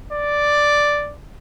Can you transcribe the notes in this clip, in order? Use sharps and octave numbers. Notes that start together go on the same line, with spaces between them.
D5